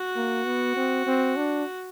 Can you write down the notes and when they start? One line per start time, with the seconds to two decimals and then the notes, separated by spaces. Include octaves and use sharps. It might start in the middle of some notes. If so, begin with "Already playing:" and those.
Already playing: F#4
0.16 A#3
0.46 B3
0.76 C4
1.07 C4
1.36 D4